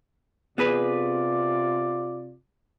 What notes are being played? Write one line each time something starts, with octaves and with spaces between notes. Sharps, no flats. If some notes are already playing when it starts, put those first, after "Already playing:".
C3 B3 F4 G#4 B4 D5